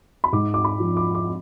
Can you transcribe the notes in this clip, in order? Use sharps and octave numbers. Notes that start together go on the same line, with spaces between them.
B5
G#2 D6
D6
B5
F3
D6
D6